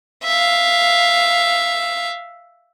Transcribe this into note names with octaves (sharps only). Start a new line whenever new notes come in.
E5 F5